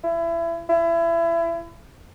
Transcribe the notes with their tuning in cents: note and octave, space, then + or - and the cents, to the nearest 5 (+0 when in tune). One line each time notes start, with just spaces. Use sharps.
E4 +30
E4 +30